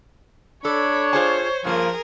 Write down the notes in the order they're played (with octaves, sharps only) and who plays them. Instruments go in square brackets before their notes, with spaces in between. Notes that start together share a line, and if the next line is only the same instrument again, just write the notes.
[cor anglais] D4 [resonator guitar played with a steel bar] A4 [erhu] C#5 [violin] B5
[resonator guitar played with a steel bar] F4 G#4 A5 [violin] C5
[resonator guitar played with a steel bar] G2 A#3 F4 [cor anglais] F3 [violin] G#4 A#4